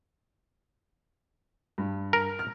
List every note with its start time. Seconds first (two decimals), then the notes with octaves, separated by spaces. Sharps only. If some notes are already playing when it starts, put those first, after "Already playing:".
1.78 G2
2.13 A#4
2.39 F6